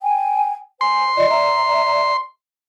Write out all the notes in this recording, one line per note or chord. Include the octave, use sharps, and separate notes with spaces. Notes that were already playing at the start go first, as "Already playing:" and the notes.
G5 G#5
C5 G#5 C6
F4 D5 D#5
D5 E5 A#5